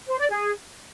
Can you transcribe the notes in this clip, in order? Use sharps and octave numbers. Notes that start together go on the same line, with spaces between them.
C5
D5
G#4